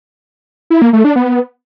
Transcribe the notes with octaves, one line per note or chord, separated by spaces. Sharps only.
E4
A#3
A3
D4
B3